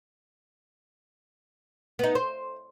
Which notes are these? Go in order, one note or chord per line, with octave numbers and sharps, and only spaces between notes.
B3 D#4
C5